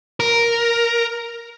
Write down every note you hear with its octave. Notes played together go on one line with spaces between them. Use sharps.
A#4